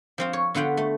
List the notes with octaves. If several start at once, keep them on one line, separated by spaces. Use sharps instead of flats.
F3 C4 F4
C#5
D3 B3 F4 F#5 G5
A3